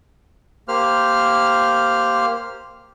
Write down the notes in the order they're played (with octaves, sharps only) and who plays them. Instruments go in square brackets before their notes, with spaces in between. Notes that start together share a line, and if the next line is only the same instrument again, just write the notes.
[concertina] A#3 G4 C5 F6